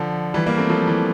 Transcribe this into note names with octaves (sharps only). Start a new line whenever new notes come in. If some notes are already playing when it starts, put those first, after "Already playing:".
Already playing: D3 F3
E3 G3
G3 A#3
A3 C4
F3 A3
E3